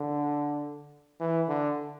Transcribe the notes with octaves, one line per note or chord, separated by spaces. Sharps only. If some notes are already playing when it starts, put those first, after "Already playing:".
Already playing: D3
E3
D3